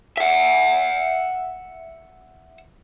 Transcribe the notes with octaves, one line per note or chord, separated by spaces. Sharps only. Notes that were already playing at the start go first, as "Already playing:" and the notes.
E5 F#5